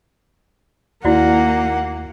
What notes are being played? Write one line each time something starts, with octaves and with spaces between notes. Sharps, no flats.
D#2 A#3 E4 F#4 D5 F#5